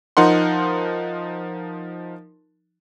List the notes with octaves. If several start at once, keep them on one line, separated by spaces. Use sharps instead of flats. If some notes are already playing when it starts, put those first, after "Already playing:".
F3 D#4 A#4 F#5 C6